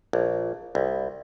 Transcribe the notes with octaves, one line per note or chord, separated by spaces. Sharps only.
A#1
C2